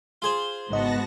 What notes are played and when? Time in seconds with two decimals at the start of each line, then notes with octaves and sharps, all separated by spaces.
0.22 F4 G#4 C5
0.71 G#1 G#2 C#3 B3 F#4 D#5 A5 A#6